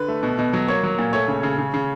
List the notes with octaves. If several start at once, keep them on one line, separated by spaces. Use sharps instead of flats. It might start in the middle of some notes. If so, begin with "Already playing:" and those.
Already playing: D3 B4
A3
B2
B2
F#3
A#3 C#5
F#3
A#2
A3 C#5
C#3
C#3
C#3
C#3